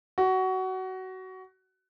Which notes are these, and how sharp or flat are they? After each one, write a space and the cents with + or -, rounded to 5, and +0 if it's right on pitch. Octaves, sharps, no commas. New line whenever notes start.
F#4 +20